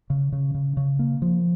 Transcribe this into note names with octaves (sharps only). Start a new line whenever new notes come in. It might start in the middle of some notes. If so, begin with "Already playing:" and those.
C#3
C#3
C#3
C#3
A#3
F3